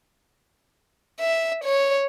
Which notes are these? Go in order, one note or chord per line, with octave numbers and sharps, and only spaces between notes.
E5
C#5